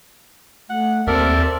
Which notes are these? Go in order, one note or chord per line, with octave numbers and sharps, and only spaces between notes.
A3 F#5
D#2 C4 A4 A#4 D5 E5